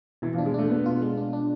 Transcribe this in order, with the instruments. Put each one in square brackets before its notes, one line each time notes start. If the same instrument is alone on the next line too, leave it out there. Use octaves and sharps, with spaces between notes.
[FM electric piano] B2 [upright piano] E3
[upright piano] F3
[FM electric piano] D4
[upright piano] G#3
[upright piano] A3 [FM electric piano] D4
[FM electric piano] B2 [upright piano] B3
[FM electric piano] F4
G#3
D4
D4